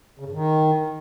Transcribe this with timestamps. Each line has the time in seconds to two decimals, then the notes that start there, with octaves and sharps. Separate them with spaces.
0.19 C#3
0.26 G2
0.33 D#3